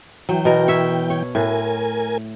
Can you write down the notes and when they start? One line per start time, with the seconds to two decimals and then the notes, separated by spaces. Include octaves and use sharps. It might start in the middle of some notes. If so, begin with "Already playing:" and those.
0.29 E3 F#3 G5
0.45 B2 A#4
0.68 C#5 E5
1.10 C#5
1.35 A2 A#4 G#5